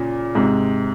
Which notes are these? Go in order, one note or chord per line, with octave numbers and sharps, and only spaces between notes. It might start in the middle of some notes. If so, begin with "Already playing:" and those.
Already playing: A#2 C#3
G#2 C3